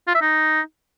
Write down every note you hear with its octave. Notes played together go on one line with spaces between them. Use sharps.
F4
E5
D#4